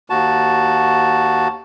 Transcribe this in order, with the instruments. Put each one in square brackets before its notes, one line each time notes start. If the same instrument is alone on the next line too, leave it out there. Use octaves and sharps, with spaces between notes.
[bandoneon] D#2 F#4 A5